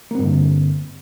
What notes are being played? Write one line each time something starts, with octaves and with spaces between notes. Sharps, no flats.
G2 D3 A#3 C4